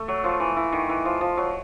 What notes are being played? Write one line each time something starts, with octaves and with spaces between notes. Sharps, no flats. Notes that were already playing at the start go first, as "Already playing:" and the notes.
Already playing: A3
F#3
F3
E3
E3
D#3
E3
F3
F3
F#3